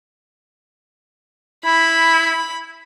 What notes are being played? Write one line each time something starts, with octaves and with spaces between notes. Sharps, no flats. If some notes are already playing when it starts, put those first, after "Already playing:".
E4 B5